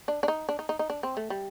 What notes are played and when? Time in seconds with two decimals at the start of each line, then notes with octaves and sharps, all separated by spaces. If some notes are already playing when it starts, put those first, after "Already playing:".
0.08 D4
0.23 D4
0.28 D#4
0.49 D4
0.59 D#4
0.69 D#4
0.79 D#4
0.90 D4
1.03 C4
1.17 A3
1.30 G3